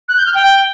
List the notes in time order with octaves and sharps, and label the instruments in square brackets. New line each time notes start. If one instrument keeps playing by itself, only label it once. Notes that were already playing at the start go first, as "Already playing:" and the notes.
[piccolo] F#6
G6
F6
G5